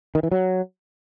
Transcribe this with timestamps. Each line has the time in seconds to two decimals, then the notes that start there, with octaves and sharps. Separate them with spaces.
0.15 D#3
0.23 E3
0.32 F#3